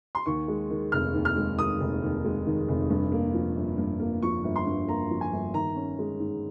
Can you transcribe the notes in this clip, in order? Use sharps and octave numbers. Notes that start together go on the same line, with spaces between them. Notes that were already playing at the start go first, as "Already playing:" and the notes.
C6
D#2 C#6
G#3
D#3
F1 F6
D#2
F6
G#3
D#3 D#6
F1
D#2
G#3
D#3
F1
G2
A#3
F3
G1
G2
A#3
F3 C#6
G1
C6
G2
A#3 A#5
F3
G#5
G1
D#3 A#5
C#4
G#3
G#2